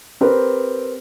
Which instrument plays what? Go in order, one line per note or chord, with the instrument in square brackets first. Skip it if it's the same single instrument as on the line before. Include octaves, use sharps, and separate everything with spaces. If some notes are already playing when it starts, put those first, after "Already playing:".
[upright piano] C4 G4 A#4 B4